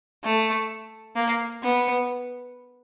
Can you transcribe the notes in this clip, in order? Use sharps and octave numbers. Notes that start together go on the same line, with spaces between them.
A3
A#3
B3